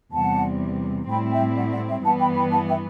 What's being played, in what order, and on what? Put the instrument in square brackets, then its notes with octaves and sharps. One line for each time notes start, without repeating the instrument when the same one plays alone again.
[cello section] E2 C3 G3 [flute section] F#5 A5
[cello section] A2 G3 C4 E4 [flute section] G5 B5
[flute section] E5 G5
D5 F#5
D5 F#5
E5 G5
[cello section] G2 E3 B3 [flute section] F#5 A5
[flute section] G5 B5
G5 B5
F#5 A5
E5 G5